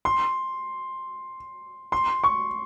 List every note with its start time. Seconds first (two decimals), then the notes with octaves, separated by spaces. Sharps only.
0.05 C6
1.92 C6
2.24 C#6